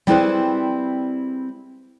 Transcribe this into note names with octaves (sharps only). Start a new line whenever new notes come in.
G3 C4 E4 G#4 B4 C5